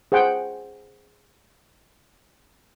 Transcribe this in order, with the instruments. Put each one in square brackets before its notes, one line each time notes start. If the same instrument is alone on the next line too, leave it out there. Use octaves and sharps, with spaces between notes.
[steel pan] G#4 C5 F#5 G5